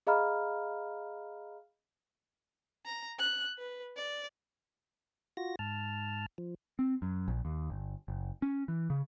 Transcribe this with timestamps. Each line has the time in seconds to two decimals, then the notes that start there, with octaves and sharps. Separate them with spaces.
0.07 G#4 D#5 F5 A#5 B5 F6
2.86 A#5
3.19 F#6
3.58 B4
3.96 D5
5.37 F4 F#4 A#6
5.59 G#2 A5 F6
6.38 F3
6.79 C4
7.02 F#2
7.28 A#1
7.45 D#2
7.70 G1
8.08 F#1
8.42 C#4
8.68 E3
8.90 C#3